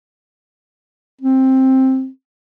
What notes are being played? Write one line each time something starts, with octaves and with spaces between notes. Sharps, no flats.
C4